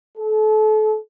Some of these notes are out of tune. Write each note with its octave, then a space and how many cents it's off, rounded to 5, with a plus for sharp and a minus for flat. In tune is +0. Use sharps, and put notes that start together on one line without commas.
A4 -35